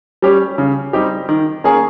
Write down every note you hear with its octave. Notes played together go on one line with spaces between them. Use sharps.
G3 C#4 G4
C#3
G3 C4 D#4 G4
D#3
A#3 C#4 G#4